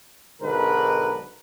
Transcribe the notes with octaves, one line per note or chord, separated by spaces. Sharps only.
B1 G#2 D3 G#3 A#4 B4